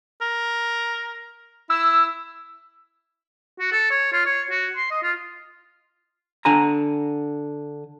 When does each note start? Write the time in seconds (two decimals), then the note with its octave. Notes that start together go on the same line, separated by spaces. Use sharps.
0.21 A#4
1.70 E4 E6
3.60 F#4
3.72 A4
3.91 C#5
4.13 F4
4.26 C#5
4.51 F#4
4.76 C6
4.91 D#5
5.03 F4
6.45 D3 G#5 A#5